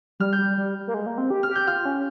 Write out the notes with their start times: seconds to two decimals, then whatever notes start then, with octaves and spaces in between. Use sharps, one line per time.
0.20 G3 F6
0.33 G6
0.38 G3
0.57 G3
0.87 A#3
0.94 G#3
1.06 A#3
1.18 C4
1.30 G4
1.43 F6
1.49 G4
1.56 G6
1.67 F4 F6
1.85 C#4